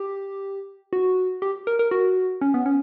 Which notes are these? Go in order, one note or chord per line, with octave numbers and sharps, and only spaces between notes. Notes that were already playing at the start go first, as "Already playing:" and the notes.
Already playing: G4
F#4
G4
A#4
A#4
F#4
C#4
B3
C#4